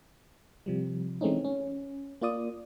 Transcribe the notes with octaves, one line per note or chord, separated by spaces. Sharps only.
C3 F3 G3
E3 G#3 A3 C4 C#4 D#4
C#4
A#3 F4 D5 D#6